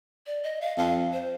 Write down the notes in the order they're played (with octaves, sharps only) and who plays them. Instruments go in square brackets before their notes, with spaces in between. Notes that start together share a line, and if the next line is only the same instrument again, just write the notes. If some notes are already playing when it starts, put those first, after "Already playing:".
[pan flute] D5
D#5
F5
[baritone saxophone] F2 [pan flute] F5
[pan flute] C5